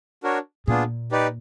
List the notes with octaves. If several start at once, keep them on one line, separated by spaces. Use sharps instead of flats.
D4 F#4 A#4 C#5
A#2 B3 D4 F4 G#4
D#4 G4 B4 D5